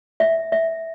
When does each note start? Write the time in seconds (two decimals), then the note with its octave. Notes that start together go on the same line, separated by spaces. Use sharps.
0.20 E5
0.52 E5